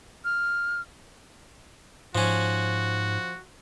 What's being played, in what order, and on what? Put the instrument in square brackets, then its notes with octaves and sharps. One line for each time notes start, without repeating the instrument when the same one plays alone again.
[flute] F6
[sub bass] G#2 [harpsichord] F3 C#4 [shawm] F#4